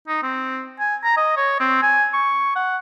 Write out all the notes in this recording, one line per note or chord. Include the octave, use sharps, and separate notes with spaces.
D#4
C4
G#5
A#5
D#5
C#5
C4
G#5
C#6
F#5